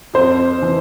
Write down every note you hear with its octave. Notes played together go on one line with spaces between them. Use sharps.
F2 C5
E3